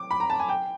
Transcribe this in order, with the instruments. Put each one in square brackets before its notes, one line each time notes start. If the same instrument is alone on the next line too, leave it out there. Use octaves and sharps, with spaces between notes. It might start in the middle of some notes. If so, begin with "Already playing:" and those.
Already playing: [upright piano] D6
B5
A#5
A5
G#5
G5